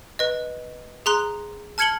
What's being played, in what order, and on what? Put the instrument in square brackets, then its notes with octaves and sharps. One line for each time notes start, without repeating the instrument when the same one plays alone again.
[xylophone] B4 D#5
G#4 A#5 C6 F#6
A5 F6 G#6 C#7 F#7 G7